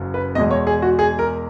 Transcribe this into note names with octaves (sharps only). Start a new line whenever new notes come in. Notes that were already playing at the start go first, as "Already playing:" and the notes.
Already playing: F#1 F#2 F#3
B4
E2 B2 G#3 D#5
C#5
G#4
F#4
G#4
A#4